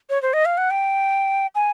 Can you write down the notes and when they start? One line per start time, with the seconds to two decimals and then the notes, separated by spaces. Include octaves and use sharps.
0.10 C#5
0.22 C5
0.33 D#5
0.45 F5
0.58 F#5
0.71 G5
1.55 G#5